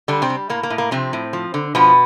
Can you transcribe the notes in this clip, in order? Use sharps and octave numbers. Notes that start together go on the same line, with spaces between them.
D3 G3 D4
C3 C4
G3
A2 A#3
A#3
A2
A#3
C3 F3 C4
A2
F3
D3
B2 F3 B3